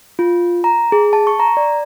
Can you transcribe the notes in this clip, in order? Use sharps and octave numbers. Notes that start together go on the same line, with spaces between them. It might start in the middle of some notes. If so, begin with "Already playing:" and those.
F4
A#5
G#4
A5
C#6
A#5
D5